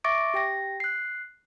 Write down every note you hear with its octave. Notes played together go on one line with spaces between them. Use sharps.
E5 C#6 D6 A6 A#6 D7
G4 G5 A#6
F#6 C7